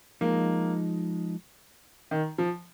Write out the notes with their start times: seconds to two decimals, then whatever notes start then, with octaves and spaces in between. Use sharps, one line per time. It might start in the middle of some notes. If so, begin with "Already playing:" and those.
0.21 F3 G#3 A#3 D#4
2.11 D#3
2.38 F3